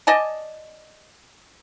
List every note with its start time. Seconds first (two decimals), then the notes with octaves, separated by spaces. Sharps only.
0.07 D5 D#5 G#5 A5